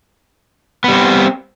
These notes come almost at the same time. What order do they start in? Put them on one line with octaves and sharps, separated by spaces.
B3 G3 C4